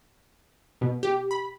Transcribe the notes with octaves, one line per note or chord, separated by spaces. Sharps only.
B2
G4
B5